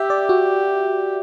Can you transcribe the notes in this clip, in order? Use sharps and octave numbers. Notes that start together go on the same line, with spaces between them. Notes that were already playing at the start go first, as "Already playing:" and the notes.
Already playing: G4 E5
D5
F#4